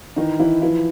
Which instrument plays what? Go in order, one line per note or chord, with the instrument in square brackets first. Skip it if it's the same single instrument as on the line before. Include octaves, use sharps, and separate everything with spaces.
[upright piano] D#3 E3 D#4
E3 E4
E3 F3 E4